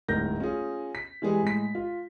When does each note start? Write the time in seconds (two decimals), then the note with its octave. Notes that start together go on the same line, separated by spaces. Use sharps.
0.09 D1 G#2 A#4 G6 A#6
0.40 C#4 F4 G#4
0.95 B6
1.22 E3 G3 G#3 G#4
1.42 A2 G#3 B6
1.75 F4